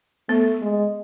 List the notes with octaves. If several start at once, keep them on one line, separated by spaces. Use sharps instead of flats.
A3 B3
G#3